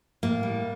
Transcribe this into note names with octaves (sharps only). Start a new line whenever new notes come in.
A2 A#3
G3